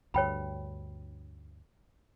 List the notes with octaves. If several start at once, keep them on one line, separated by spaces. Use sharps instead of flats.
D2 G2 C#5 G5 B5